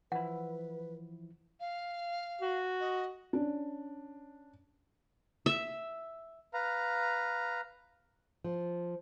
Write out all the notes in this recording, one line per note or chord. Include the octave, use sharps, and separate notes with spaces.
E3 F3 E4 B4 F#5
F5
F#4
D#5
C#4 D4
E5
B4 F5 A#5
F3